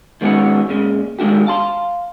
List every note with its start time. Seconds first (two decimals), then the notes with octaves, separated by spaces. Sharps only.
0.21 D#3 G#3 B3 C#4 F#4 F#5
0.70 A#2 C#3 G#3
1.19 D#3 G#3 D4 F#4 G4
1.47 F5 A5 C6